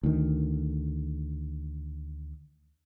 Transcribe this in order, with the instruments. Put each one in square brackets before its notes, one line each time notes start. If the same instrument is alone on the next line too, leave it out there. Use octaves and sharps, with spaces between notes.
[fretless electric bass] D2 D#3